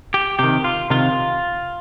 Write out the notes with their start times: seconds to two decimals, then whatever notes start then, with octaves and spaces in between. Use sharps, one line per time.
0.14 G4
0.39 C3 D#3 G4
0.64 F4
0.90 C3 D#3 F4